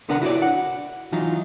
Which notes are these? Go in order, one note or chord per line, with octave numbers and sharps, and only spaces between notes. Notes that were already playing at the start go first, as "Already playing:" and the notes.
C2 D3 B3 D4 A#4 F#5
E4 F#4 G#4 C#5 D5
F#5
E3 F#3 D#4 F4